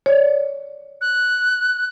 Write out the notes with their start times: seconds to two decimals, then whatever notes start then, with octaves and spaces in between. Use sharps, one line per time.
0.06 C#5 D5
1.01 F#6